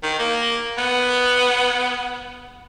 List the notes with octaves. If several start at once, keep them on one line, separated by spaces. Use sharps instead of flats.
D#3
A#3
B3